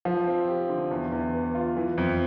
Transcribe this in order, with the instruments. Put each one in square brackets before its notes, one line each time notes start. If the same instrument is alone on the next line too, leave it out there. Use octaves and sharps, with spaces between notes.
[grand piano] F3
C4
G4
D3
E2
E2
B3
F4
E3
F2